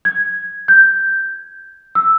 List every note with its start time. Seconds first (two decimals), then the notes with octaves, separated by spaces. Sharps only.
0.05 G#6
0.68 G6
1.95 E6